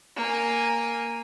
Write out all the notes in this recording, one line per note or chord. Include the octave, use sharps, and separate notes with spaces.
A#3 G#5